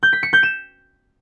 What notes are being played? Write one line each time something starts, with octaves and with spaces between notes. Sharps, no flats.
G6
B6
C#7
G6
E7